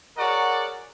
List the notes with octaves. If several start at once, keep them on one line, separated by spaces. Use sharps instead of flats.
F#4 G#4 A#4 C#5 D5 F#5